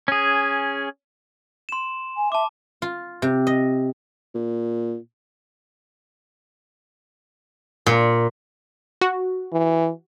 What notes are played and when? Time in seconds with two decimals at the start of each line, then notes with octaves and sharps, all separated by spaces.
0.08 C#4 G#4
1.69 C6 E7
2.17 G#5
2.32 E5 A5 D6
2.82 F4
3.22 C3
3.47 D#5
4.35 A#2
7.86 A#2
9.01 F#4
9.52 E3